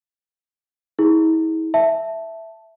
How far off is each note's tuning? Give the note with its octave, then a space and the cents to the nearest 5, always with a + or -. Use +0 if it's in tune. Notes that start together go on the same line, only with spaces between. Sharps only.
E4 -40 G#4 +0
E5 +0 A5 +0